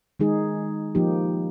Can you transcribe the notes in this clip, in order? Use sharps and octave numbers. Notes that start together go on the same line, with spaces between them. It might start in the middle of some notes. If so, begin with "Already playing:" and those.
D#3 G#3 D#4 G#4
F3 A#3 D#4 G4